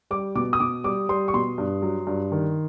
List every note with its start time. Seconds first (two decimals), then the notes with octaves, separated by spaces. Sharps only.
0.11 G3 D6
0.35 B2 D6
0.53 D#6
0.60 B2 D6
0.84 G3 D6
1.09 G3 C6
1.28 C#6
1.34 B2 C6
1.58 G2
1.82 F#3
2.07 G2
2.32 D#3